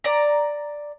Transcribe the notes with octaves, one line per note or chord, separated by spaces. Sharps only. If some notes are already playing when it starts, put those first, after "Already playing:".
D5 A#5